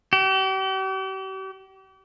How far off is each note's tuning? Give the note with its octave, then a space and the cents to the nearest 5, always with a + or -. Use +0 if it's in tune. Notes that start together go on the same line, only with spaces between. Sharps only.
G4 -40